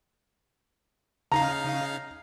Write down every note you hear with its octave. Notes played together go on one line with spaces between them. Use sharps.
C#3 D#4 F5 A#5